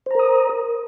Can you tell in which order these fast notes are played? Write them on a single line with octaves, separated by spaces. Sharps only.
C5 A#5 A#4 D#6